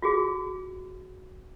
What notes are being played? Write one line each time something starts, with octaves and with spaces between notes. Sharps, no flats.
F4 F#4 G#4